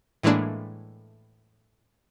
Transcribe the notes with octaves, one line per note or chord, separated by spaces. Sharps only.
A2 E3 G#3 A#3 D4